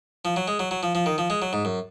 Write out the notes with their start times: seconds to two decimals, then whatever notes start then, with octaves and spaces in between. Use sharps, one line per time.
0.25 F3
0.36 F#3
0.48 G#3
0.59 F#3
0.71 F#3
0.83 F3
0.95 F3
1.06 D#3
1.18 F3
1.30 G#3
1.42 F#3
1.53 G#2
1.65 F#2